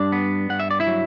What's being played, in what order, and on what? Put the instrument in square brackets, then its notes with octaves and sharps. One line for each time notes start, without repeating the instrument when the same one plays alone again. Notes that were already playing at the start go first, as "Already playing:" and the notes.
Already playing: [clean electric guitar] G2 D4 D5
B3
G2 F#5
E5
D5
E4 E5
F#3